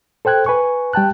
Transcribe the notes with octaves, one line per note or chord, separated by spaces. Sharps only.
A4 C5 G5 F#6 G#6
B4 G#5 C#6
G3 G5 A5 F#6